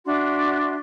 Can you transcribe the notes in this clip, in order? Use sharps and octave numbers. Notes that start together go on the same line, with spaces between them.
D4 F#4 E5 C6